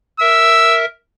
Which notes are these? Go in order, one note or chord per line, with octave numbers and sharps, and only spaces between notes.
A#4 E5 E6